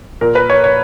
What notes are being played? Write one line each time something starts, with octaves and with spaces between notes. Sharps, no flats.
A#2 A#4
B4
C#5
C#5